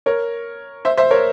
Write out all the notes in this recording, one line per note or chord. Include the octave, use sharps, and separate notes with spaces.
A#4 C#5
C5 E5
C5 E5
A#4 C#5